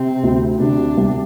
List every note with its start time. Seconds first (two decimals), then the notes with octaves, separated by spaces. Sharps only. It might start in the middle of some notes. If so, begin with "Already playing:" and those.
Already playing: C3 C4
0.23 D2
0.60 C3 D4
0.97 C2